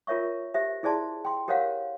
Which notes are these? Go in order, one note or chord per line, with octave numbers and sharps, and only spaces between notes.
F4 A#4 C#5 E5 C#6
G4 C5 E5
E4 G#4 C5 D5 A5 C6
G5 C6
G4 A#4 C5 C#5 F5 F#5